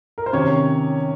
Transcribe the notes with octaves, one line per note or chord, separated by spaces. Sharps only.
A#4
C5
C3 D#3 C#4 C#5